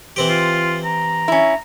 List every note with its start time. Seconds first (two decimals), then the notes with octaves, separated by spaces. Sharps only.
0.16 E3 C4 G4
0.30 F4
0.85 A#5
1.28 C#4 E4